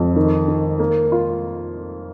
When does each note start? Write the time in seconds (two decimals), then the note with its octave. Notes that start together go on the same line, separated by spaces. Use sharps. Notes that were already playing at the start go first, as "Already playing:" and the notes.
Already playing: F2
0.16 D#3
0.48 D#3
0.79 A#3
1.12 F4